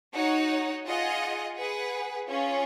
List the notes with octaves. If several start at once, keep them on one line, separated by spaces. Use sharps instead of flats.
D#4 F#4 C#5 F#5
F4 G#4 D#5 F#5
G#4 B4 F#5
C#4 F4 G#4